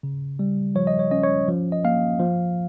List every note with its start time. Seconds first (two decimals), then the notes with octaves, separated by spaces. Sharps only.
0.03 C#3
0.39 G3
0.75 F3 C#5
0.87 D#5
0.99 C#5
1.11 C#4 D#5
1.23 C#5
1.48 F3
1.72 D#5
1.85 A#3 F5
2.20 F3